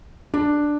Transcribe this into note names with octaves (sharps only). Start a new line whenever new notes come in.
D4